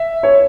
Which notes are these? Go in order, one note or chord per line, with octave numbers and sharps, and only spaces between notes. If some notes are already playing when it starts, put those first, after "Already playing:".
Already playing: E5
C#5